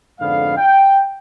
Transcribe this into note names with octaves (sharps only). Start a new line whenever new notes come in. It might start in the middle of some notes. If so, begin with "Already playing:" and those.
F2 G#2 D3 B3 F5
G5